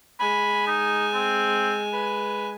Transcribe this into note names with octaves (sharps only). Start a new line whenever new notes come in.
G#3 G#5 B5
D#4
C4
B4